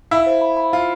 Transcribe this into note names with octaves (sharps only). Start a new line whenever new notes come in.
E4 F5
C5
B5
B5
F4 F5